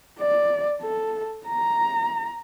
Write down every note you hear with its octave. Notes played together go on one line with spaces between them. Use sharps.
D5
A4
A#5